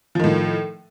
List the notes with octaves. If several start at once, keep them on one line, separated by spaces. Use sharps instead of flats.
A2 D#3 F3